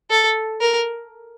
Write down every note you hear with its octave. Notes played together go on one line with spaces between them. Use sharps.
A4
A#4